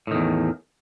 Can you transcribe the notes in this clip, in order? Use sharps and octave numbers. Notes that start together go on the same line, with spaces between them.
E2 A2 D#3